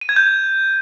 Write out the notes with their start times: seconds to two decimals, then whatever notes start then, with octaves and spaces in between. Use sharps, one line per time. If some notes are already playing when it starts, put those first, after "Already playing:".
0.01 D#7
0.09 G#6
0.16 G6